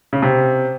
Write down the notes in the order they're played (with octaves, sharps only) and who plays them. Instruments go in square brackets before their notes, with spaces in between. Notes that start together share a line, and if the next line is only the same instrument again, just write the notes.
[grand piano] C#3
C3